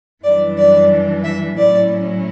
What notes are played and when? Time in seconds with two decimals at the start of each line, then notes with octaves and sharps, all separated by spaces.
0.24 F#2 E3 G3 D4 D5
0.58 D5
1.24 E5
1.57 A2 F#3 C#4 E4 D5